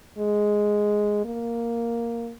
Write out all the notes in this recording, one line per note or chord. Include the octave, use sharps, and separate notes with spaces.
G#3
A#3